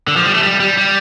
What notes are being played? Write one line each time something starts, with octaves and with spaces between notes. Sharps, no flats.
D3
F3
G3
A3
G3
G3
G3